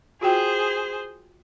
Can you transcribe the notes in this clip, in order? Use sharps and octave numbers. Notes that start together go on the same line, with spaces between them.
F4 F#4 G#4 C5 G5